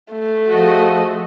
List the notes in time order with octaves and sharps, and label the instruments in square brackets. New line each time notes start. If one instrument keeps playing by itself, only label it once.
[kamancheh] A3
[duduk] F3 [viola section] F#4 G#4 D#5